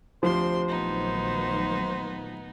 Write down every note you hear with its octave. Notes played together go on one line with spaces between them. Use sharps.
D2 C3 F3 C5 C6
A#1 D#3 F#3 A3 B3 D#4